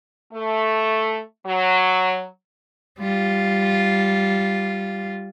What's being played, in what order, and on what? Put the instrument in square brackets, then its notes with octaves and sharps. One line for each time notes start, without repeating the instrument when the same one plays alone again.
[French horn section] A3
F#3
[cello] G3 F4